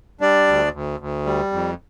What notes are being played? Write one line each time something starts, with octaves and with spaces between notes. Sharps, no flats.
G3 D4 D5
D2
D2
D2
G3
F2